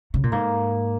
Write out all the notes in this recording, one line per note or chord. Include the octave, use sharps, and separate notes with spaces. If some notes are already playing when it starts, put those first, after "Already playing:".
C#3
A#2
G#2 A#3